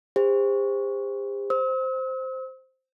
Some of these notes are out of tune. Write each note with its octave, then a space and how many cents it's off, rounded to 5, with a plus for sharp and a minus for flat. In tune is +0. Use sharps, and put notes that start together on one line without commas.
G4 +45 C5 +0
C5 +0 E6 -45